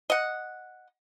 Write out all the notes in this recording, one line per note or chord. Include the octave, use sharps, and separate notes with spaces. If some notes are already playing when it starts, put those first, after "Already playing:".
D#5 F#5